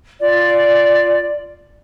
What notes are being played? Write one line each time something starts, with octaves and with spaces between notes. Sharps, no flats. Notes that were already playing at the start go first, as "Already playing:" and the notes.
F4 D5